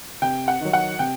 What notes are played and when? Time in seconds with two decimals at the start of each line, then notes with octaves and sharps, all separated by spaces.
0.22 C3 G5
0.48 F#5
0.61 D#3 F#3
0.73 F#5
0.99 C3 G5